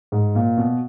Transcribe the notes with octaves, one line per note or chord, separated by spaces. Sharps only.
G#2
A#2
B2